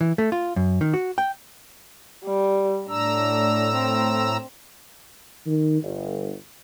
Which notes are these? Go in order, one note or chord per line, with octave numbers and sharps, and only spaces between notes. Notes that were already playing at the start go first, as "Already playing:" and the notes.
E3
A3
F4
F#2
D#3
F#4
G5
G3
A2 D4 A#5 E6
C4
D#3
G1